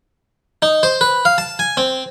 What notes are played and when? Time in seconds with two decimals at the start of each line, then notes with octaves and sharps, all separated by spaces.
0.62 D#4
0.83 C5
1.01 B4
1.25 F5
1.38 A5
1.59 G#5
1.77 C4